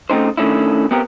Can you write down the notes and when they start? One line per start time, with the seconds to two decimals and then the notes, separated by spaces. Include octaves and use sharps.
0.10 C#3 A3 C4 D#4 C5
0.37 D#3 A3 C#4 D4 E4
0.91 B3 C4 G4 A#4